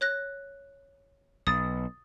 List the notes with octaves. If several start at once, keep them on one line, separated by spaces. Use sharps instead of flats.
C#5 F#6 A#6
B1 D#6 A6